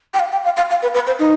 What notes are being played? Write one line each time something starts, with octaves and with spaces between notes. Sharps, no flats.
G5
F5
G5
F5
F5
F5
B4
B4
C5
D#4